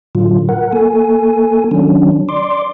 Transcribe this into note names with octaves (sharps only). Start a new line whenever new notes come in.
A2 D3 F#3 F4
A#4 F#5
A#3 A4 G#5
D#3 F#3 C#4 D4
D5 C6 D6